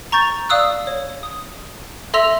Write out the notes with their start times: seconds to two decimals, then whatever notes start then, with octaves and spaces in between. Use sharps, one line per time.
0.12 A#5 C#6 G6 A6
0.49 D5 F5 D#6 E6 F#6
0.87 C#5
1.23 D#6
2.14 A4 E5 C6 E6 A#6 F7